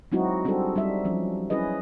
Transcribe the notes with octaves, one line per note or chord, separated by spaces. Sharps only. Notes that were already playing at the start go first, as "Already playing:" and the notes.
F#3 G#3 C4 D#4 E4 F#4
G3 C4 D4 F#4 G#4 A4
G3 D#4 E5
F3 F#3 C#4
C#4 E4 G#4 B4 D#5